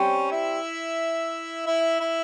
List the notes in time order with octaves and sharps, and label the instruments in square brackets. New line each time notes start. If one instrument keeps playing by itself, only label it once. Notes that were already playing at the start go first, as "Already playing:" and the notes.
Already playing: [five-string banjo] G3 C4 G4 C5 [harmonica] C#4 C#5
[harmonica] E4 E5
E4 E5
E4 E5